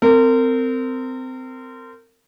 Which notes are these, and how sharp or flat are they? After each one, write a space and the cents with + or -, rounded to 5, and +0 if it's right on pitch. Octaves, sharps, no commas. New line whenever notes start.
C4 -20 A#4 -35